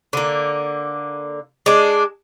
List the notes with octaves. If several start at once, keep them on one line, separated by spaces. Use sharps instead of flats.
D3 A#3
G#3 D4